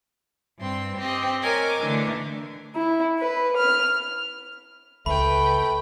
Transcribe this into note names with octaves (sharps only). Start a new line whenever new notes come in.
G2 C4 C6
C4 G4 D#5
A#4 C#5 D#5 G#5 D6
D3 E3 A3 D4
E4
B4
F6
C#2 A3 B4 G5 B5